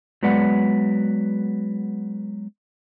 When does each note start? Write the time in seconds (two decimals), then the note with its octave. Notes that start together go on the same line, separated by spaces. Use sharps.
0.23 F#3 G#3 B3 B4 D5 F#5